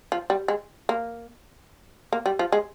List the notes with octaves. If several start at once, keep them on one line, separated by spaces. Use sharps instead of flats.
F3
G3
G#3
A#3
A#3
G3
F3
G#3